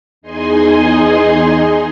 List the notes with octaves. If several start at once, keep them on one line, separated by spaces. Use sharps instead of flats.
E2 D#4 G#4 D#5 G#5 C6